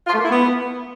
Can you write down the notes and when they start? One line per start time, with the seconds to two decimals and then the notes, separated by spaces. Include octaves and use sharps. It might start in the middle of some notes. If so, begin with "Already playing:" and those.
0.07 F4
0.13 A3
0.19 A#3
0.25 E4
0.31 B3